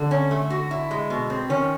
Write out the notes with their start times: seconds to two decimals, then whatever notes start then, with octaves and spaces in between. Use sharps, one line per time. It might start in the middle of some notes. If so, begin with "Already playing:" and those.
Already playing: D3
0.11 C#4
0.31 A3
0.50 F#4
0.71 E4
0.91 G#3
1.10 B2
1.30 C4
1.49 D#3 C#4